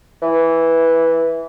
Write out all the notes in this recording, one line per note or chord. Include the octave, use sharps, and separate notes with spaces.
E3